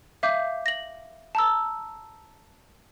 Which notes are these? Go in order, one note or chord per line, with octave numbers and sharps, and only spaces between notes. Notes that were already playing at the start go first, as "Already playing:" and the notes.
E5 F5 D6 G6
A#6 F#7
A5 A#5 E6